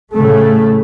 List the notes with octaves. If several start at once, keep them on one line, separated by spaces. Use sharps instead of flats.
A2 C#3 A3